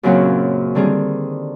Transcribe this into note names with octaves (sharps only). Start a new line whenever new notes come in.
F#2 A#2 C#3 F#3 C4 F#5
D3 D#3 G3 C4 G#4